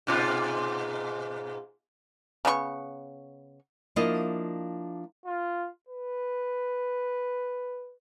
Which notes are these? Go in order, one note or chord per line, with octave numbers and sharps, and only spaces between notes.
G#2 B2 F4
C#3 B3 F#4 C#6
F3 A#3 D4 E4 D#5
F4
B4